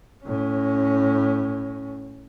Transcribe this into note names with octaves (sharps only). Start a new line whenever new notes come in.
A2 C#4